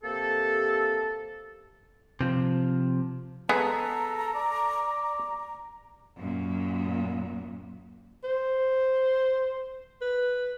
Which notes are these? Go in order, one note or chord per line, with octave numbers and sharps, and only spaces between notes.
C3 A#3 G4 A4
C3 F3
G#3 B3 A4 A#5
D5
F#2 A#2
C5
B4